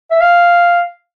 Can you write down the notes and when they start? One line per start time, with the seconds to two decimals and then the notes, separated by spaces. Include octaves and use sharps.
0.11 E5
0.21 F5